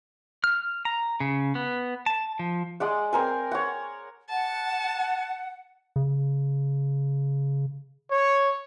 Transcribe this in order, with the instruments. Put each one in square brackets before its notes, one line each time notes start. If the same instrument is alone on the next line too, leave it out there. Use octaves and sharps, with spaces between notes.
[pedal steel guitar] F6
A#5
C#3
B3
A5
F3
[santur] G#3 D5 F#5
C4 A#4 G#5
C#5 F#5
[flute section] F#5 [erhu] A5
[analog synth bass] C#3
[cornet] C#5